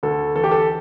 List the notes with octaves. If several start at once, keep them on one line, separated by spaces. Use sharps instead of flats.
D2 A4
E3 A4
G4
A4